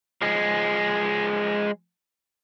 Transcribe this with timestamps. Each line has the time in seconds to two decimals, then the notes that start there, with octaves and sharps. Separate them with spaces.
0.22 F3 G#3